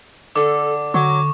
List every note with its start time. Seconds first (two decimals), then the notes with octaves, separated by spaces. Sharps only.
0.36 D3 A4 D6
0.94 D3 F#3 C#6 D6